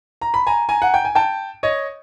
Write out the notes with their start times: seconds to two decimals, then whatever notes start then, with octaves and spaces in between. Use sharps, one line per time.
0.21 A#5
0.34 B5
0.47 G#5 A#5
0.69 G#5 A#5
0.82 F#5
0.94 G5
1.05 G#5
1.15 G5 A5
1.63 C#5 D#5